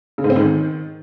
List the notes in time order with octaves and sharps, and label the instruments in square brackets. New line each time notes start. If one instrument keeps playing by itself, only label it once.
[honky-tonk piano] C#3
G#2
C4
G#2
D#3